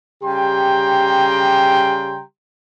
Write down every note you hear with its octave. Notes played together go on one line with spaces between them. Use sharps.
C#3 G3 G4 G5 A#5 C6